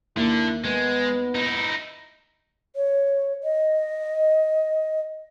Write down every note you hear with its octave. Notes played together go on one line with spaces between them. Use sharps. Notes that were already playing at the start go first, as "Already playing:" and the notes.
D#2 D3 A#3 E4
G#3 B3
D#4 E4
C#5
D#5